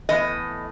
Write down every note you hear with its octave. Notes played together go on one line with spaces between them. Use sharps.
A2 E3 B3 D#5